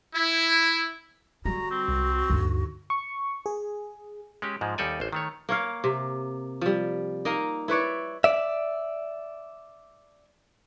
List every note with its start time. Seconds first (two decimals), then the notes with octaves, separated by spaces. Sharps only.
0.15 E4
1.45 D3 G3 F#4 A#5
1.71 C4
1.88 C2
2.30 D2 G2 D3 D#4
2.90 C#6
3.46 G#4
4.42 G#3 C#4 G4
4.61 G#2 F3 G#3
4.78 D#2 G3 D#4 A4 D5 G#5
5.00 A1 C5
5.13 D#3 A3 C#5
5.49 A#3 C#5 F5
5.84 C3
6.61 F3 G3
7.25 A#3 D#4 A#4
7.68 E4 B4 C#5 D5
8.24 D5 E5